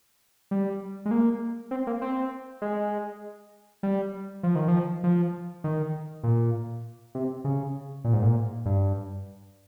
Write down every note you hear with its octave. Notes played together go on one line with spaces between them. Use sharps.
G3
G#3
A#3
C4
A#3
C4
G#3
G3
F3
D#3
F3
F3
D#3
A#2
C3
C#3
A#2
G#2
A#2
G2